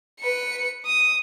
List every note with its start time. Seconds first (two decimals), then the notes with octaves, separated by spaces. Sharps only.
0.20 B4 C#7
0.86 D#6